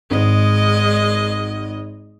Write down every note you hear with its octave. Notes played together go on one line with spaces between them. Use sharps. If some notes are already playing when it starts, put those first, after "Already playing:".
G#1 G#3 D#5